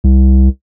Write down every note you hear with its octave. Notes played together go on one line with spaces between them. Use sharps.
C2